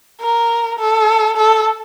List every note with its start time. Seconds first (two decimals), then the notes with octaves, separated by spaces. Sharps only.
0.21 A#4
0.79 A4
1.37 A4